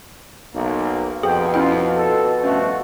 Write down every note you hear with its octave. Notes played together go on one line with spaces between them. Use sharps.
B1 A#3
F2 B2 G#4 G5
C#4 E4 F4 G5
A4
G2 F3 A3 C#4 F#4